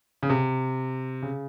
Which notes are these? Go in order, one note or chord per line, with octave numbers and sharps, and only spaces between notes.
C#3
C3
C#3